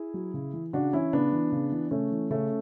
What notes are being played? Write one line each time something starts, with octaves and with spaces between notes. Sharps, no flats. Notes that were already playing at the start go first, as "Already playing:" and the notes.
Already playing: E4 G#4
F#3
C#3
E3
C#3 D4 F#4
E3 C#4 E4
C#3 B3 D4
E3
C#3
E3
C#3 A3 C#4
E3
C#3 A3 C#4